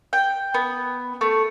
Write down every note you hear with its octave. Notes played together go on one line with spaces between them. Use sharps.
G5
B3
A3